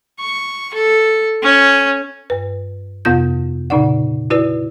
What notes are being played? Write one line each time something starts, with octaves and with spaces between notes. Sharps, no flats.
C#6
A4
C#4
G2 B4
F2 C3 B3 F4 G6
A#2 C#3 D#4 D5 F#5
E4 F#4 B4 D5